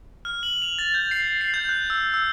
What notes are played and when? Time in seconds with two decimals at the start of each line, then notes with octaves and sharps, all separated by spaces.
0.25 F6
0.43 F#7
0.62 F7
0.79 A6
0.94 G6
1.11 C7
1.28 C7
1.41 C7
1.54 G6
1.69 F#6
1.90 E6
2.14 E6